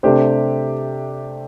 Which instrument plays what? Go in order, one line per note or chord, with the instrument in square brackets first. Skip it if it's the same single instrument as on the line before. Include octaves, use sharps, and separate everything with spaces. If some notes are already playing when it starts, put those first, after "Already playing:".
[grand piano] C3 A3 D4 G4 C5